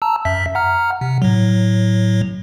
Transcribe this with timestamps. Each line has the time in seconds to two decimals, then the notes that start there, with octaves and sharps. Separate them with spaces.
0.02 A5 A#5 E6
0.25 F#2 E5 B6
0.55 F#5 A#5 F6
1.01 C3
1.22 A2 F#3